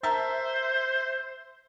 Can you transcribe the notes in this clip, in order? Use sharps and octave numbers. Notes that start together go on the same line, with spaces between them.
A#4 C5 E5 A5